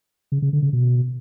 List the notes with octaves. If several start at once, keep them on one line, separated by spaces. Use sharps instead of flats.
C#3
C#3
D3
C#3
B2